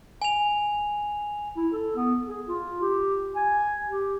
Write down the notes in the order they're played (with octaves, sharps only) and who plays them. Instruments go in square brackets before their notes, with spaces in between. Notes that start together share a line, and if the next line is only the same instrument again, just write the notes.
[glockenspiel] G#5 F7
[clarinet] E4
A4
B3
G#4
F4
G4
G#5
G4